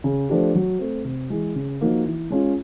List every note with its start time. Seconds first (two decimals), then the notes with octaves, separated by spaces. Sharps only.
0.04 C#3
0.29 F3 A3 D4 G4
0.55 F#3
0.79 A3 C4
1.05 C3
1.30 E3 G#3
1.55 C#3
1.81 F3 A#3 D#4 F#4
2.05 E3
2.30 G#3 C#4 F4